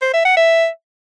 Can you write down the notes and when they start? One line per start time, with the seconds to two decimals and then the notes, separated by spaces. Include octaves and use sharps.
0.02 C5
0.13 E5
0.25 F#5
0.37 E5